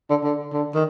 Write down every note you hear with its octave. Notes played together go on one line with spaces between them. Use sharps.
D3
D3
D3
D#3